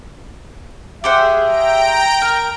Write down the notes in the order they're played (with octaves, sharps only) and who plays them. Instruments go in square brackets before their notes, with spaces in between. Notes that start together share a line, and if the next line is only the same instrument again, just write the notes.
[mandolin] G4 C5 F#5 [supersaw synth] G#4 [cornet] E5
[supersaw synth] G5 A#5 D7
[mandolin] A#4